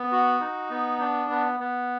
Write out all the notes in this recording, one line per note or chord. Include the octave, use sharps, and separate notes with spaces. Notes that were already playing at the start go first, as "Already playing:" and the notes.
Already playing: B3
F#4
D#4
B3
D4
B3
B3